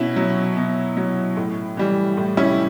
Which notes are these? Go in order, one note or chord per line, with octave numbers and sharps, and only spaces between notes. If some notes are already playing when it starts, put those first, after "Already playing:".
Already playing: B2 C#4 E4
F#3
B2
F#3
A2
E3 G3
A2
C#4 E4